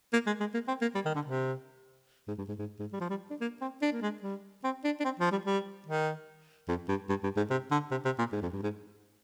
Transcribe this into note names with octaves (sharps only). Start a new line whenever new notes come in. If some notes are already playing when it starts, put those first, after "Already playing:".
A#3
G#3
G#3
A#3
C4
A#3
G3
D#3
D3
C3
G#2
G2
G#2
G#2
G#2
G3
F3
G3
D4
A#3
C4
D4
A#3
G#3
G3
C4
D4
D4
C4
F3
G3
G3
D#3
F2
G2
G2
G2
G#2
C3
D3
C3
C3
A#2
G#2
F2
G2
G#2